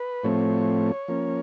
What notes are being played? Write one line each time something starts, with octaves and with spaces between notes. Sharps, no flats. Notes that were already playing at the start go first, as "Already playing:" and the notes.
Already playing: B4
A2 F3 A3 C4 C#5
F3 A#3 C#4